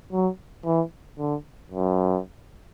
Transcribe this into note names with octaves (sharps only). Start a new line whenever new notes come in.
F#3
E3
D3
F#2